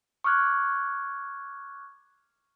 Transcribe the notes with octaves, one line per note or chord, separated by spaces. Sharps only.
C#6 D6 F6 F#6 G#6